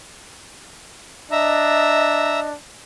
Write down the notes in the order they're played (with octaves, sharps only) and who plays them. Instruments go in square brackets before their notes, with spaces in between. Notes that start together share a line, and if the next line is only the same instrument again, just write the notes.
[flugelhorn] D4 [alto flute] D#5 [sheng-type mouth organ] E5 A#5